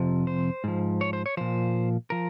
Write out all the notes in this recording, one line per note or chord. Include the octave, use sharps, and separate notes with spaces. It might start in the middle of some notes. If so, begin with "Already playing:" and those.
Already playing: F2 C3 F3
C5
G#2 F3
C#5
C5
C#5
A#2 F3 C5
F3 A#4